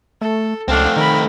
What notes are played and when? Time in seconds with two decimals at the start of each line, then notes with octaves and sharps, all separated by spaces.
0.21 A3 A4
0.68 C#2 A3 C4 D4 F5
0.96 D#3 A#4 B5